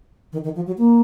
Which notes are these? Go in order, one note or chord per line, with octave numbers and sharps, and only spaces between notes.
D#3
D#3
F3
F#3
A#3